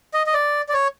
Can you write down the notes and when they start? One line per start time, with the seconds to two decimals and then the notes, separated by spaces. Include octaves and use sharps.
0.14 D#5
0.27 D#5
0.34 D5
0.69 D5
0.74 C#5